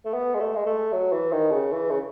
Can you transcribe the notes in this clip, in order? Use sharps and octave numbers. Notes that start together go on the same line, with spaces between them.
A3
B3
G#3
A3
G#3
A3
F#3
E3
D#3
C#3
E3
C#3